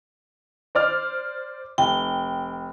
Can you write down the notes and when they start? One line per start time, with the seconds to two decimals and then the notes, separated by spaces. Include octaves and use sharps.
0.75 C5 D5 F6
1.78 F1 G5